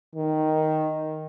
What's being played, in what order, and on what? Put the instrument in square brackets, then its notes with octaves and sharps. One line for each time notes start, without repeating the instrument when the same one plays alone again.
[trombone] D#3